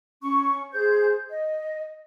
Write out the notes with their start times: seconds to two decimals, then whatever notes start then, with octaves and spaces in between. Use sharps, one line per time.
0.21 C#4 C#6
0.73 G#4 C5 G6
1.30 D#5